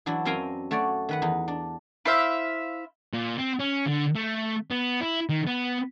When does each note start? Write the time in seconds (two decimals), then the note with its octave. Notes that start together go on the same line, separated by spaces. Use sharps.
0.06 E3 F#3 D4 E4
0.25 F#2 C4 F5 G5 G#5 A#5
0.71 A3 F#4 C#5 D5
1.09 D#3 B4 F#5
1.22 E2 D#4
1.48 D4
2.05 E4 C5 E5 F5
3.13 A#2
3.38 C4
3.59 C#4
3.87 D3
4.15 A3
4.70 B3
5.01 E4
5.29 D#3
5.47 B3